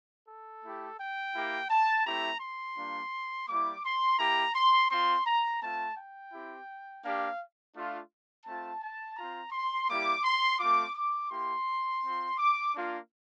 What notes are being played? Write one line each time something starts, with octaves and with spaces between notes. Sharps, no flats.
A4
A3 E4 G4
G5
A#3 E4 G4
A5
A3 C4 E4 G4 A#5
C6
G3 A#3 D4 F4
G3 A#3 E4 D6
C6
A#3 E4 G4 A#5
C6
C4 F4 C6
A#5
A3 C4 F4 A5
G5
C4 E4 G4
A#3 D4 G4 F5
A3 D4 F4
A3 C4 F4 A5
A5
C4 F4 A#5
C6
G3 A#3 E4 G4 D6
C6
A3 C4 F4 D6
D6
A#3 E4 G4 C6
C4 F4
D6
A#3 D4 F4